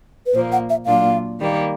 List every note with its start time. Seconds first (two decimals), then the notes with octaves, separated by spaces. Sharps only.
0.26 B4
0.34 A#2 F3 A#3 C5
0.52 F#5
0.70 E5
0.86 A#2 F#3 A#3 D4 F4 F5
1.39 D#3 G3 A#3